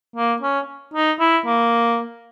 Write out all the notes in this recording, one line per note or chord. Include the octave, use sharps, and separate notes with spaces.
A#3
C#4
D#4
E4
A#3